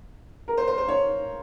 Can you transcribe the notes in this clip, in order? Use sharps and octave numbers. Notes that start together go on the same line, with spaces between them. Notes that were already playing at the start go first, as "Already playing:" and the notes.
A#4
C5
C5
C5
C#5